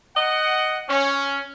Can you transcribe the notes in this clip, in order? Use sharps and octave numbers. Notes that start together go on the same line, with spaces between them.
D#5 F#5
C#4